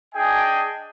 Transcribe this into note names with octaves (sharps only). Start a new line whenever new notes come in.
D4 G#4 D#5 G5 G#5